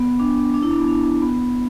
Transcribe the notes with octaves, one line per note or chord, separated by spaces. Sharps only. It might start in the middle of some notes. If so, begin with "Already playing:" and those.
Already playing: B3
D4
D4
E4
D4
B3
D4
B3